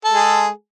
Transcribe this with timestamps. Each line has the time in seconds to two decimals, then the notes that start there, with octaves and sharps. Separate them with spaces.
0.04 A4
0.09 G#3
0.14 G#4